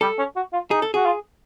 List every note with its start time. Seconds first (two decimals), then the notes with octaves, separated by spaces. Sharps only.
0.01 G3 A4
0.18 C#4
0.36 F#4
0.53 F4
0.71 D#4 G#4
0.82 A4
0.94 F#4 G#4
1.05 F4